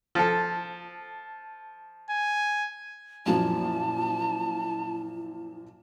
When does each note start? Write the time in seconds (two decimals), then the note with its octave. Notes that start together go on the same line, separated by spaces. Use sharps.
0.15 F3 A4
2.11 G#5
3.26 F#2 A#2 F3 E4 A5